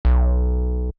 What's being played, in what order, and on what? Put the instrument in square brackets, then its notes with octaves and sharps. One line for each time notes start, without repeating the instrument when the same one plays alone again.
[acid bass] B1